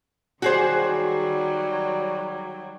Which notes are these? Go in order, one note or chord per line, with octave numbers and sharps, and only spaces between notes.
D#3 F#3 G3 F#4 G#4 C5